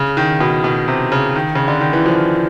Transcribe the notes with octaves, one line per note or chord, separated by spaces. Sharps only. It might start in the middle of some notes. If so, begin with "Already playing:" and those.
Already playing: C#3
D#3
B2
B2
C3
C#3
D#3
C#3
D3
D#3
E3
F3